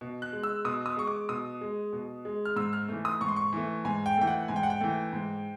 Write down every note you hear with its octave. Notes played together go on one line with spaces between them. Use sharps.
B2
F#6
G#3
E6
B2 D#6
D#6
G#3 C#6
D6
B2 D#6
G#3
B2
G#3
F6
G#2 E6
F6
E3 A3
D#6
G#2 C#6
C6
C#6
E3 A3
G#2 G#5
G5
E3 A3 G5
F#5
G#2 G#5
G5
F#5
G5
E3 A3
G#2